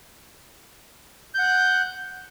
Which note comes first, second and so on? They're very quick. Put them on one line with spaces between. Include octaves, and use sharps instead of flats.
G6 F#5 F#6